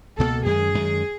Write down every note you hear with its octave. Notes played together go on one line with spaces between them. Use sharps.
C#2 B2 F#3 A#3 A4
F#2 D#3 G#3 G#4
F#2 D#3 G#3